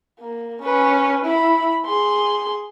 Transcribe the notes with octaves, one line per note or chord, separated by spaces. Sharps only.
A#3
C#4 B4
E4 B5
G#4 C6